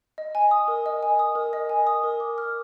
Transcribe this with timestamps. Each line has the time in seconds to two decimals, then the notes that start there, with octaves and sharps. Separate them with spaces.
0.18 D#5
0.35 G#5
0.51 D#6
0.68 A#4
0.86 D#5
1.03 G#5
1.19 D#6
1.35 A#4
1.53 D#5
1.69 G#5
1.87 D#6
2.04 A#4
2.20 D6
2.38 F6